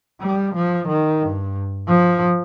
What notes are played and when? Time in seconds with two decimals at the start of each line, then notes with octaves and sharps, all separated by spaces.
0.21 G3
0.55 F3
0.88 D#3
1.22 G2
1.87 F3